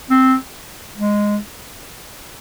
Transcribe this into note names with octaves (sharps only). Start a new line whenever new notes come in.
C4
G#3